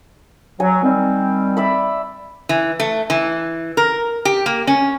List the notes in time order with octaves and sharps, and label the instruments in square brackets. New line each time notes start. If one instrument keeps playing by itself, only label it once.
[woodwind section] F#3 [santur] G#5
[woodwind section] D#3 G3 C4
[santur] D5 E5 B5
[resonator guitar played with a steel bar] E3
A3
E3
A#4
G4
A#3
C#4